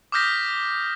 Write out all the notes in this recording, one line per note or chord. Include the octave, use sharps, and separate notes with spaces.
D6 D#6 F6 G6 A#6 B6